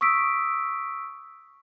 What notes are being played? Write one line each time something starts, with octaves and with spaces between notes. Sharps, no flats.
C#6 D#6 E6 B6 D7